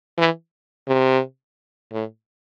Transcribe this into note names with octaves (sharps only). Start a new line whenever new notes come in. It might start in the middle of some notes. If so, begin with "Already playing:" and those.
E3
C3
A2